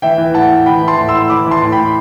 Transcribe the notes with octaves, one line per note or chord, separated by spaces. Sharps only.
E3 E5 G5
E3
A2 F#5 A5
A2
E3 G5 B5
E3
A5 C6
A2
C6 E6
A2
E3 B5 D6
E3
A5 C6
A2
G5 B5
A2